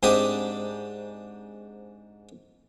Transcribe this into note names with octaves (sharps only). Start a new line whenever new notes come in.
G#2 C4 D4 G4 D#6